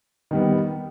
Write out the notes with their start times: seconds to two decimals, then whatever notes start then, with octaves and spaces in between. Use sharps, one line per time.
0.31 D#3 G3 B3